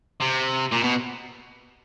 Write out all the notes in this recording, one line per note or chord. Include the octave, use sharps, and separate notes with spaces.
C3
A#2
B2